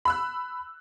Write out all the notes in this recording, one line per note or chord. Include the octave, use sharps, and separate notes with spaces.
B5 E6 F#6